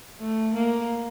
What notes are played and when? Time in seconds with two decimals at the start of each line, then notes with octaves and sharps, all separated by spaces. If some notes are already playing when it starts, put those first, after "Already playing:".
0.20 A3
0.55 A#3